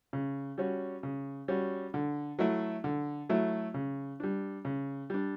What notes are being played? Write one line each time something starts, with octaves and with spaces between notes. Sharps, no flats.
C#3
G3 C#4 F#4
C#3
G3 C#4 F#4
D3
F#3 A3 E4
D3
F#3 A3 E4
C#3
G3 D4
C#3
G3 D4